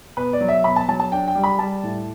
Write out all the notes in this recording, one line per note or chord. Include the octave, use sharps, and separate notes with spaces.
B2 B4
D5
F#3
E5
B2 B5
A5
F#3 A5
A5
D4 G5
G5
G3
B5
G3 A5
A2